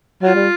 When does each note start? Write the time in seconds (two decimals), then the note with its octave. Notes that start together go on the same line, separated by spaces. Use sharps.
0.23 F#3 F4
0.35 G3